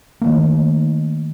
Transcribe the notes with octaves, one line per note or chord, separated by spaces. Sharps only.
D#3 F3 A3 A#3